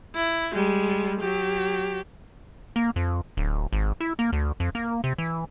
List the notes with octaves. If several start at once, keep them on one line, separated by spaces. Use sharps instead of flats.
E4
G3 G#3
F#3 G4
A#3
F2
D1
G#1
E4
A#3
D2
F2
A#3
C3
E3